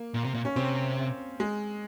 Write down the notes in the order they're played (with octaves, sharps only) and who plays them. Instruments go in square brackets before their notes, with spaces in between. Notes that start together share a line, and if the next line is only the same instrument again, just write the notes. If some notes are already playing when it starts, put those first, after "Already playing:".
Already playing: [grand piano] A#3
[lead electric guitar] A#2
C3
A#2
[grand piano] C#4
[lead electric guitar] C3 [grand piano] C4
[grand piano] G#3